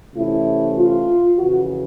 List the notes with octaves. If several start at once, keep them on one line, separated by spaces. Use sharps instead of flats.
C3 E3 A3 C#4 E4
F4
F2 C#3 E3 F#4